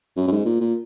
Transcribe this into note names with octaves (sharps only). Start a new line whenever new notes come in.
F#2
F#2
G#2
A#2
A#2